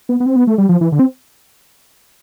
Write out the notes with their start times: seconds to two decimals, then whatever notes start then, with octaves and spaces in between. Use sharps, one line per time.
0.09 B3
0.20 B3
0.26 C4
0.36 B3
0.47 A3
0.58 G3
0.69 F3
0.81 E3
0.92 D3
0.99 C4